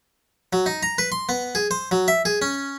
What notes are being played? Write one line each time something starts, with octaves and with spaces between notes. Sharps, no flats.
F#3
D#4
A#5
B4
C6
B3
G#4
C5
F#3
E5
G#4
C#4